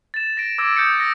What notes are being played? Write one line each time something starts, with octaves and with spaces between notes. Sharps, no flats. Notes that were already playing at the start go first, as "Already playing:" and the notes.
A6 E7
A#6 D7
D6 E6 G#6 A#6 D7
D#6 G6 A6 C#7 E7
A#6